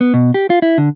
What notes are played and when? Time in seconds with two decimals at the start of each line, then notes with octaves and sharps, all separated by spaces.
0.01 B3
0.14 B2
0.34 G4
0.50 F4
0.62 E4
0.78 D3